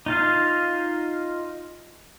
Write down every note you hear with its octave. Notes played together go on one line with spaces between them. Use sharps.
D#4 F4 F5